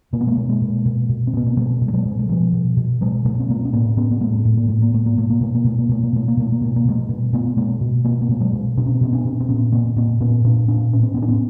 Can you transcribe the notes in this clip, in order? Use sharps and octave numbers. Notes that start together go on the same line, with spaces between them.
B2 A#3
B3
G#3 A#3
B2
G#3 A#3
B2
B2
B2
C4
B2 B3
A#3
B2 G3 A3
B2
A3
F#3 G#3
B2
G#3
B2 F3 G3
B2
B2
B2 F#3 G#3
B2 G3 A3
C4
B2 A3 B3
C#4
A2 A#3 C4
A2 B3 C#4
B3
A2 G#3 A#3
A2 A3
A#3
A2 A3
A#3
A2 A3
A#3
B2 A3
A#3
B2 A3
A#3
B2 A3
A#3
B2 A3
A#3
B2 A3
A#3
B2 A3
A#3
B2 A3
A#3
B2 G3 A3
B2
B2 A3 B3
B2 G#3 A#3
B2
B2 A#3 C4
A#3
B2 A3
F#3 G#3
B2
B2 D4
C#4
C4
B2 B3 C#4
C4 D4
B2
C4
A#2 B3 C#4
A#2 A#3 C4
A#2 A#3 C4
A#2 B3 C#4
A#2 C4 D4
A#2 C4 D4
A2 C#4
C4
A2 B3 C#4
D4
B3 C#4